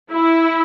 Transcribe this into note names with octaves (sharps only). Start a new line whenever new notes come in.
E4